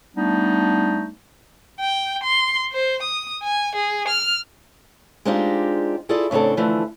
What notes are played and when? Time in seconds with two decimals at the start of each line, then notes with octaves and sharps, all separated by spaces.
0.16 G3 A3 B3 D4 D#4
1.80 G5
2.24 C6
2.72 C5
3.02 D#6
3.43 G#5
3.75 G#4
4.08 F6
5.25 G#3 C4 D4 D#4 F4 G4
6.09 E4 F4 G#4 A4 D5
6.31 A2 C#3 C4 D4 A4
6.57 D3 E3 F3 A3